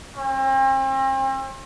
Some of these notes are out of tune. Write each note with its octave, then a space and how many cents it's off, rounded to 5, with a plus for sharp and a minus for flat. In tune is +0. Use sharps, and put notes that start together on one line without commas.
C4 +40